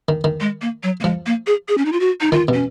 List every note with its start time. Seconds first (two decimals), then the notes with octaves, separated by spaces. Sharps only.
0.09 D#3
0.24 D#3
0.40 G#3
0.61 A#3
0.83 F#3
1.00 A#3
1.04 F3 G#3
1.26 A#3
1.47 G#4
1.68 G#4
1.78 C#4
1.85 D#4
1.92 F4
2.00 F#4
2.21 D#4
2.32 D#3 F4
2.48 B2
2.53 C#4